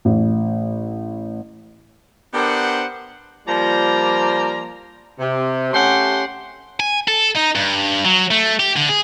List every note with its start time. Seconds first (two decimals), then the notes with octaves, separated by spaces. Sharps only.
0.05 A1
2.34 B3 D4 G4 A#4 C5 F#5
3.47 F3 G3 A#3 C5 D5 A#5
5.19 C3
5.73 A3 C#4 G4 F#5 C6
6.80 G#5
7.08 A4
7.36 D#4
7.55 G2
8.05 F#3
8.31 A3
8.59 G4
8.76 D3
8.89 G#4